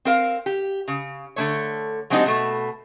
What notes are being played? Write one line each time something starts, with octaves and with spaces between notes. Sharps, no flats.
C4 A#4 F5
G4
C#3
D3 A3 C#5
F#3 G#3 C4 D4 D#4 G4
B2 A3